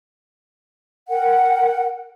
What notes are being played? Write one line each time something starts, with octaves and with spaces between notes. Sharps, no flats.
A#4 F#5 G5